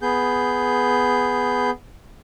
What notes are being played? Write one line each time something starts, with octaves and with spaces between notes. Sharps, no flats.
B3 G#4 G6